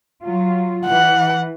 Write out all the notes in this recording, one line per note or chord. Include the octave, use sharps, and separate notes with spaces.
F#3 F4
E3 F#5